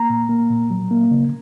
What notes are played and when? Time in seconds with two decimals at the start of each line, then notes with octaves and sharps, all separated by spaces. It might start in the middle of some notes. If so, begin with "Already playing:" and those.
Already playing: A#3 A#5
0.10 A#2
0.29 A#3
0.50 A#2
0.70 F#3
0.91 A#3
1.11 C#3